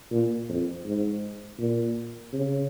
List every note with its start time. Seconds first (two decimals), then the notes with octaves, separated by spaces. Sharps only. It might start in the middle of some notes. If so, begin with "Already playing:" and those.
0.12 A#2
0.49 F2
0.85 G#2
1.59 A#2
2.33 C#3